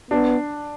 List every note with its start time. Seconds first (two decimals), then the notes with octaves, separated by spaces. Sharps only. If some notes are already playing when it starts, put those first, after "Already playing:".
0.11 B3 D4